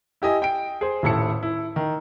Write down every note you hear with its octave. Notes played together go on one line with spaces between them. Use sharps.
E4 G4 D#5 G#5
G5 D7
G#4 C5
D#1 A2 E4 A5 C#7
E4
D#3